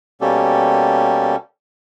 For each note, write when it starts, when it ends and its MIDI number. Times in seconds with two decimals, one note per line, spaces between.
0.21 1.36 47
0.21 1.36 55
0.21 1.36 58
0.21 1.36 61
0.21 1.36 67
0.21 1.36 69